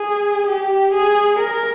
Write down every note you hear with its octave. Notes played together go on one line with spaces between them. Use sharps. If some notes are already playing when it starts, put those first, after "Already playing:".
Already playing: G#4
G4
G#4
A#4